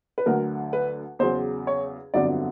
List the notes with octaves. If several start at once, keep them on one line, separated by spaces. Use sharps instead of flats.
B4
D2 D3 F#3 A#4
B4
E2 C#3 F#3 C5
C#5
G1 F2 D3 F#3 D5